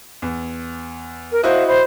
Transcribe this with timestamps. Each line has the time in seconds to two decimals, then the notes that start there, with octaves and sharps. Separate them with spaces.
0.22 E2
1.32 A#4
1.43 E4 F#4 C5 D#5 F5
1.68 C5 B5